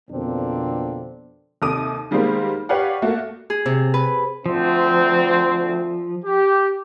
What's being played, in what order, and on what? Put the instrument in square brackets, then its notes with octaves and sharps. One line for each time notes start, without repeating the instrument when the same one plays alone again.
[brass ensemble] F2 B2 D3 A#3 C4 D4
[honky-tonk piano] D#2 C3 A4 D6 D#6 D#7
D#3 G3 G#3 A#3 B3 C5
G4 B4 C#5 D5 F5 F#5
A3 A#3 F#4
[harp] G#4
C3
B4
[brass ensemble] D2 C4 [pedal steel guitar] F3
[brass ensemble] G4